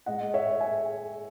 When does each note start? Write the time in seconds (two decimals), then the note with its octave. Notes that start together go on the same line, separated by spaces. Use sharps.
0.06 A2 G#3 D#5 F#5
0.34 C#5 E5
0.60 E5 G#5